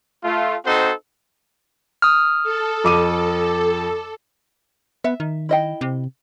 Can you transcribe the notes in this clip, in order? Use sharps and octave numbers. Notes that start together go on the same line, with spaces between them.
A3 F4
C4 D#4 F#4 A4 C5
D#6 F6
A4
F2 D6 D#7
B3 E5
D#3
E4 D#5 G5
C3